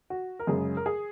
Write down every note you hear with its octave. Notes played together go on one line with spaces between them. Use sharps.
F#4
A#4
F#2 C#3 G#3 G#4
A#4
G#4